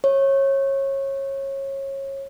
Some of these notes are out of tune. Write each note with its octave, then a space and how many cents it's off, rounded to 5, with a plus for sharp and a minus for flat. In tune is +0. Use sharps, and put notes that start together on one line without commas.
C#5 -25